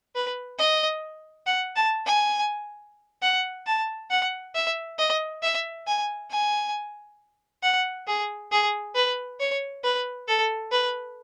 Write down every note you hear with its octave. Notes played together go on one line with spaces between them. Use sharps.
B4
D#5
F#5
A5
G#5
F#5
A5
F#5
E5
D#5
E5
G#5
G#5
F#5
G#4
G#4
B4
C#5
B4
A4
B4